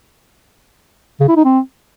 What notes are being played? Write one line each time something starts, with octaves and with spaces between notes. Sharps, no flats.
C#3
E4
D#4
C4